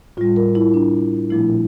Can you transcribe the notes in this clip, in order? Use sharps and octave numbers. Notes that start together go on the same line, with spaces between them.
A2 G3 F4
A#4
E4
D4
A#2 F3 A3 E4